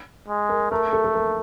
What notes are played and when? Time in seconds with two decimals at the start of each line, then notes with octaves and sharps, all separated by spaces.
0.28 G#3
0.49 A#4
0.71 A3 A#4
0.93 A4
1.04 A4
1.15 A#4